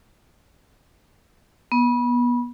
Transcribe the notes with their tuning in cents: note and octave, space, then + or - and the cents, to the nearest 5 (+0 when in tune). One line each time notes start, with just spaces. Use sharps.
B3 -25